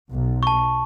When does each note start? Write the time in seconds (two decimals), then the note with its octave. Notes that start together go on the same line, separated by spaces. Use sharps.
0.10 B1
0.43 A5 C#6